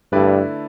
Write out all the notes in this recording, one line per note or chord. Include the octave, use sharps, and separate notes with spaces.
G2 D3 A3 E4 B4 D5